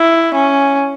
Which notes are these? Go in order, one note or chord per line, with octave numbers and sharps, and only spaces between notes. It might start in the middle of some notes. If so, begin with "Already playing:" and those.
Already playing: E4
C#4